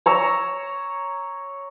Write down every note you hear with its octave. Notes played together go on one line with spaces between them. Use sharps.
C#5 A#5 E6